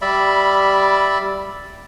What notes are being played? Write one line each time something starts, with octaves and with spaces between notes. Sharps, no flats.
G3 D5 E5 B5